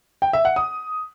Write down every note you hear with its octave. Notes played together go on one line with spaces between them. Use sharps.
G5
E5
F#5
D#6